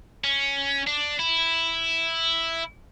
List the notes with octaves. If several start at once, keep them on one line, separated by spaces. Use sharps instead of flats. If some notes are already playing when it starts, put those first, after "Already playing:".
C#4
D4
E4